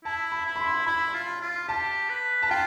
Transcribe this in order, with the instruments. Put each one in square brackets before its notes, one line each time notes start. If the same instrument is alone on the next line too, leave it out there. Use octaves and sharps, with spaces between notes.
[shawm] E4 [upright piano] A5
[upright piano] B5
[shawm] E4
[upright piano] B5
C6
[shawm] E4 [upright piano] B5
[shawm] F4
F4
[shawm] G4 [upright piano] A5
[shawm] B4
[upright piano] A5
[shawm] F4 [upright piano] G5